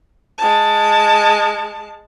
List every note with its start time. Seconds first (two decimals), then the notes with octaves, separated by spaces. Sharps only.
0.38 G#3 A5